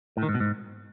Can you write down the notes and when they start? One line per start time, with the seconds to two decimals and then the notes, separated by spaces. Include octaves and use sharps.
0.17 A2
0.23 D#3
0.29 G#2
0.34 B2
0.40 G#2